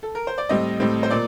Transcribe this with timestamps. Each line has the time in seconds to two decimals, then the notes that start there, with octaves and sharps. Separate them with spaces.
0.03 A4
0.15 A#4
0.27 C5
0.38 D5
0.49 A2 G3 C4 D#5
0.80 A2 G3 C4
1.03 C5
1.10 A#2 D5